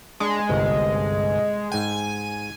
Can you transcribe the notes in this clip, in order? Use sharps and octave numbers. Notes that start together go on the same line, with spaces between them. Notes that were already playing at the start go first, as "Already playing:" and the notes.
G#3 D4 G#5
G1 C2 G2
G#2 G5 G#5